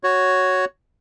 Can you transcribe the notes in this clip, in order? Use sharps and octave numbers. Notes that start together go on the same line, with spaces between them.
F#4 C#5